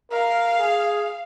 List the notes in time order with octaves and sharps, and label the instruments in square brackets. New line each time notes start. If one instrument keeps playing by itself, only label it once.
[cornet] A#4 [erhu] F5
[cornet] G#4